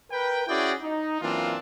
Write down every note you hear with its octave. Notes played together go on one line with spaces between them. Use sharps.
A#4 B4 G5
C#4 E4 F#4 G#4 D5 G5
D#4
F#2 E3 A#3 C4 D4 F4